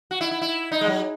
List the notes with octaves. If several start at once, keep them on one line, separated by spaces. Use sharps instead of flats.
F#4
E4
E4
E4
D#4
G#3
F#3